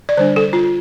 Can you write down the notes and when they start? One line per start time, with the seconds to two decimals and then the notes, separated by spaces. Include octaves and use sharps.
0.09 D5
0.17 D3 G3 D4 C5
0.36 A4
0.53 F4